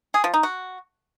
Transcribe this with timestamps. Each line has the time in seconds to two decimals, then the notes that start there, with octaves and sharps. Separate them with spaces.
0.14 G#4
0.24 F3
0.34 D#4
0.43 F#4